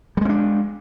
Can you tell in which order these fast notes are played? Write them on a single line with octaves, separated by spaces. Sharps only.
G3 G#3 C4 D4